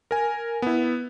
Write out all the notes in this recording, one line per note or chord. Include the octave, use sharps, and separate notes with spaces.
A#4 G#5
B3 E4